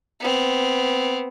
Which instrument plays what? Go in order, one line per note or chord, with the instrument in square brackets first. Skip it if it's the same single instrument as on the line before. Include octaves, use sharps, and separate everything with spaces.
[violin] B3 C4